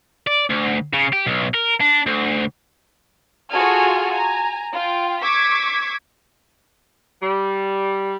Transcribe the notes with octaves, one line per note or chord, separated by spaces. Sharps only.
D5
D2
C#3
G4
B1
A#4
D4
D2
F4 F#4 G#4 A4 G#5 F6
G#5 A#5
F4 G5
C#6 D6 E6 G#6 B6
G3